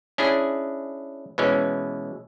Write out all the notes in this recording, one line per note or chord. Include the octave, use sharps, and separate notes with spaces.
C#4 D4 E4 G#4
B2 E3 G#3 C#4